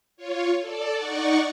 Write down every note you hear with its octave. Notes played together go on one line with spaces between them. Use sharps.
F4 C#5
A4 D5
D#4 D5 F#5 C#6